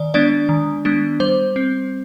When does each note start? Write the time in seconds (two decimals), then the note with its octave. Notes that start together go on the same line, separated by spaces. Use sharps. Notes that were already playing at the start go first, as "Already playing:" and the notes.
Already playing: D#3 D5
0.14 G#3 B3 D4 D5
0.49 D#3
0.85 G#3 B3 D4
1.20 G3 C5
1.56 C4